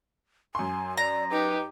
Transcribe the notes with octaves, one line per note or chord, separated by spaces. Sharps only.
F#2 G#5 C6
D5 A#5
D#4 G4 B4